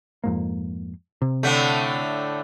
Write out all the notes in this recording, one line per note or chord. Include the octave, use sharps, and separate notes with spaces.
F2 G#2 A#3
C3
A2 D3 A3